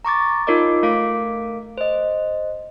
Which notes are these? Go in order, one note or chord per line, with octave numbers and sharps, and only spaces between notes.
A#5 C#6 D6 A6
D#4 F4 A#4 C#5 D#5 D6
A3 A#4 F5 D6 B6 D7
C5 D#5